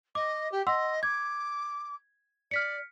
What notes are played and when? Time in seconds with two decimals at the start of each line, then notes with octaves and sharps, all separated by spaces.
0.15 D#5 D6
0.51 G4
0.67 D#5 F#5 C6 E6
1.03 D6 G#6
2.51 D5 F6 B6 C#7